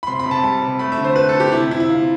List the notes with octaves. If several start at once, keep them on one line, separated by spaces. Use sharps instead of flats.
B5
C3 C6
B5
C3
A5
G3 A5
C3
A3 B5
E5
D3
C5
A3 B4
A4
D3
G4
C3 E4
C3 E4
E4
C3 F4